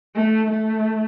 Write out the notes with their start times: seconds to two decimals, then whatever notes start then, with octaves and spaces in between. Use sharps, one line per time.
0.16 A3
0.51 A3